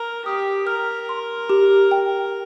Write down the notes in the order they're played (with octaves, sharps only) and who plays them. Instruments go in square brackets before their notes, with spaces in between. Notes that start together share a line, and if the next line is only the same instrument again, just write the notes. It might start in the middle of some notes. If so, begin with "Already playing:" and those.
Already playing: [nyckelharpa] A#4
[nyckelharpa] G4 [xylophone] D#6
[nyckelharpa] A#4 [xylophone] F6
[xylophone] C6
G4
G5